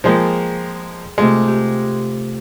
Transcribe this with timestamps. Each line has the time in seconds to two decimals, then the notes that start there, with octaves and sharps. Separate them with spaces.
0.04 F3 G#3 A#3 G#4 G5 A5
1.18 C3 G#3 A3 F4
1.48 G4